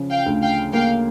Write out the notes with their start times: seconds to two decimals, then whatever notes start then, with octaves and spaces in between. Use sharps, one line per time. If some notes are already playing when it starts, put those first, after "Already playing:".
Already playing: C#3 F3
0.10 F5 G5
0.26 D2
0.42 F5 G5
0.73 A#3 F5 G5